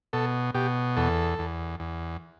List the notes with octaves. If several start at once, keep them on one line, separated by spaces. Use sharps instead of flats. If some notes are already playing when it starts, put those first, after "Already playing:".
B2 A4
B2 G4
E2 A4
E2
E2